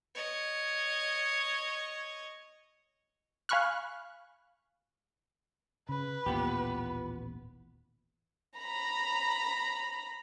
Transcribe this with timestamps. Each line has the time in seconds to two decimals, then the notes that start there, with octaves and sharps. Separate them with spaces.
0.15 C#5 D#5
3.49 F5 G#5 B5 C#6 F6 F#6
5.89 C#3 B4
6.26 D#1 A1 D#2 A#2 B3 G4
8.57 A#5 B5